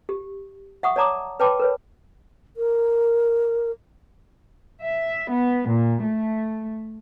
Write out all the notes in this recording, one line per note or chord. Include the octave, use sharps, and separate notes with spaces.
G4
E5 F#5 C#6 D#6
C#5 D5 A5 A#5 D6 D#6
B4 C#5 G5 A5 B5 D6
A#4 B4 C#5
A#4
E5
B3
A#2
A3